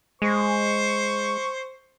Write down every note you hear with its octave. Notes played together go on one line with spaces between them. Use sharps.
G#3 C5 C#6